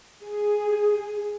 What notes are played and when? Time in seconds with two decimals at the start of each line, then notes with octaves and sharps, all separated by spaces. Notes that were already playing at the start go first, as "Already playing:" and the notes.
0.21 G#4